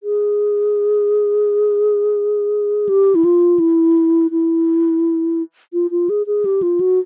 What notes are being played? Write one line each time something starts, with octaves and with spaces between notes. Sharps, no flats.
G#4
G4
E4
F4
E4
E4
F4
F4
G#4
G#4
G4
F4
F#4